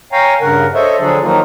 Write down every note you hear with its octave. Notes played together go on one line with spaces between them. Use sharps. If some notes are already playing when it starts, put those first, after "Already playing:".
C#5 F5 G5 G#5 A#5
G2 C#3 A#4 F#5
A4 C5 C#5 D#5 E5
D3 F3 F#3 D4 G#4 A4
D#3 F3 F#3 A#3 D#4 F4